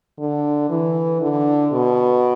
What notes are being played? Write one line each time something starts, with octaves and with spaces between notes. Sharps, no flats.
D3
E3
D3
B2